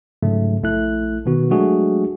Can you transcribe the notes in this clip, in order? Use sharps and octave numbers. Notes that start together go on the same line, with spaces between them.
G#2 C#3 F#3 A3
A#1 A3 E4 F#6
B2 D#3 B3 F#4
F#3 G#3 A3 D4 F#4 G#4